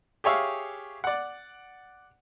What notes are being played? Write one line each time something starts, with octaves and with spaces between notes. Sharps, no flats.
G4 G#4 C#5 E5 F5
D5 F#5